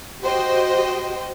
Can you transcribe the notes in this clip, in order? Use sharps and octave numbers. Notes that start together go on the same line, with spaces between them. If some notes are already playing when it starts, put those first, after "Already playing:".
F#4 G4 C5 D#5 G5